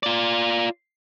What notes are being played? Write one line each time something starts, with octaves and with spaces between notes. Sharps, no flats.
F4 D5